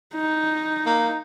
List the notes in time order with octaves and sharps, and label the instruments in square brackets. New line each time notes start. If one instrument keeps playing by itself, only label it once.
[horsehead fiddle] D#4
[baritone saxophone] A#3